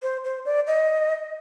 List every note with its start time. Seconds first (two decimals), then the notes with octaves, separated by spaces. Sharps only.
0.02 C5
0.24 C5
0.45 D5
0.67 D#5